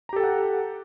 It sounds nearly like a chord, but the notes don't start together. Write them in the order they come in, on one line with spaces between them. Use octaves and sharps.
A#5 G4 A4 G5 F#5